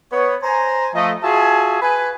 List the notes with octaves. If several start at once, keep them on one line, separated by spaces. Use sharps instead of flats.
B3 C#5
C5 G#5 A#5
F3 A3 D#5
F4 F#4 G#4 E5 G#5 A5
B4 G#5